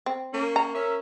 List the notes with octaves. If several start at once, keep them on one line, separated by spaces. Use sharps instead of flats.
C4
A#3 C#4
A#4 A#5
C#4 E5